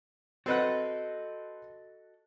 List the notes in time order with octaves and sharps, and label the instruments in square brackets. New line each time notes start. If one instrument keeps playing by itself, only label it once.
[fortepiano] C4 B4 F#5 [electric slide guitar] F#4 A4 D#5